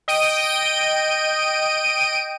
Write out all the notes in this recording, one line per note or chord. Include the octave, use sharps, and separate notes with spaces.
D#5 G5 D7 D#7